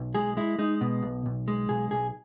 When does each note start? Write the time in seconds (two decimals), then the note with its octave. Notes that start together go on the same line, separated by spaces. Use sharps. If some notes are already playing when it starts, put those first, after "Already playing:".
Already playing: B1
0.15 G#3 G#4
0.37 G#3 E4
0.59 G#3 D#4
0.81 B2
1.02 B1
1.26 B1
1.48 G#3
1.69 B1 G#4
1.91 B1 G#4